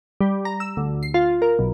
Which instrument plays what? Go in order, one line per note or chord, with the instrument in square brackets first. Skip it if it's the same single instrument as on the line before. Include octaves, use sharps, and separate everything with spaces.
[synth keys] G3
A#5
E6
D2
C7
F4
A#4
B1